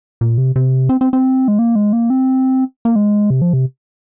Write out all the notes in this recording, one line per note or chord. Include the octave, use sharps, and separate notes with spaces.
A#2
C3
C3
C4
C4
C4
G#3
A#3
G#3
A#3
C4
A#3
G#3
C3
F3
C3